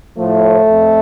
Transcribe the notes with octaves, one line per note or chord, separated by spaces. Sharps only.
A2 F3 A3
F2